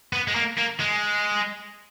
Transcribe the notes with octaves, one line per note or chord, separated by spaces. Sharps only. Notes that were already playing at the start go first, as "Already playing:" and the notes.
B3
G#3
A#3
A#3
G#3